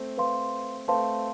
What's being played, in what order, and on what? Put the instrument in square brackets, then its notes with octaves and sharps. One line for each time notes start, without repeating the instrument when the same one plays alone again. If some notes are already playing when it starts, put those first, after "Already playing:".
Already playing: [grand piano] A3 C4
[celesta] B4 F5 C6
[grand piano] A3 C4 [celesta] B4 F5 A5 C6